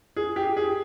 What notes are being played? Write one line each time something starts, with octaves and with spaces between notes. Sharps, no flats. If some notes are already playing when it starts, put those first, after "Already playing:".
G#4
G4
G#4